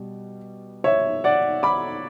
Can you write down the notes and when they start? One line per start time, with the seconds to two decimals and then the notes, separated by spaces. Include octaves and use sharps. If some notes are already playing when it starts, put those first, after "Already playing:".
Already playing: B2 G3
0.84 C#5 E5
1.24 D5 F#5
1.63 B5 D6